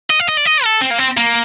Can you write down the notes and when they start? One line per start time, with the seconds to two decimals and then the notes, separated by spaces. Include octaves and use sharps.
0.10 D#5
0.20 F5
0.29 D#5
0.37 D5
0.46 D#5
0.65 A4
0.82 C4
0.91 A#3
0.99 C4
1.17 A#3